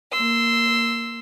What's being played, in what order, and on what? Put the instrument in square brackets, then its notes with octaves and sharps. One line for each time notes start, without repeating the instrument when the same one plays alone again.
[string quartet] A#3 C6 E6